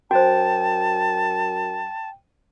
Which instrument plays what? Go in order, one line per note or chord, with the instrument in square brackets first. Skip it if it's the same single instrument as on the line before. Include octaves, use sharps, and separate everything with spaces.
[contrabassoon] F#2 [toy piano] F#4 C5 [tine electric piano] G5 [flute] A5